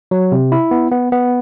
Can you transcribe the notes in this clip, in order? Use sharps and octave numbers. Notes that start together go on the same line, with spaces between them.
F#3
C3
E4
B3
B3
B3